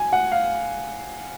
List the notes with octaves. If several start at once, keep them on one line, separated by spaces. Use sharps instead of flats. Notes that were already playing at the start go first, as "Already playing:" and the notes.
Already playing: G#5
F#5
F5